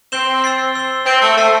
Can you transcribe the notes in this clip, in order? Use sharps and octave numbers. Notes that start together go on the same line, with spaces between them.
C4 C6 G6 E7 G7
E6 A6 C7
E6 C7 G7
C4 G6 D7 G7
A3
A3 A5 E6 C7